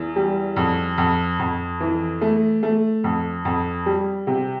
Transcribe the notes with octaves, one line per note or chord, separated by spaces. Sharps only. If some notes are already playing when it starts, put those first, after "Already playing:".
Already playing: E2
G3
F2
F2
F2
E3
A3
A3
F2
F2
G3
C3